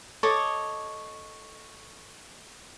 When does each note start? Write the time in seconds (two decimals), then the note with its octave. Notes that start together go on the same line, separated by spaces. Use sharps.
0.23 A4 C#5 D#5 D6